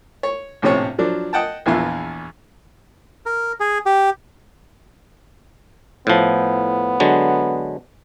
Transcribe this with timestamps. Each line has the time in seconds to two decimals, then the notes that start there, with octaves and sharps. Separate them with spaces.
0.23 C#5
0.62 A#1 A2 C3 C4 C#4 C#5
0.98 F3 F#3 D4
1.33 D#5 F#5 G5 A5
1.66 A#1 E2 E3 B3 F4 E5
3.26 A#4
3.60 G#4
3.86 G4
6.07 A2 F3 B3
7.00 D3 F#3 G#3